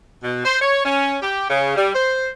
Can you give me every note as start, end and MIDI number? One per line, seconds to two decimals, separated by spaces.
0.23 0.44 47
0.45 0.56 72
0.61 0.84 73
0.85 1.17 61
1.22 1.46 67
1.49 1.73 49
1.76 1.94 55
1.94 2.28 72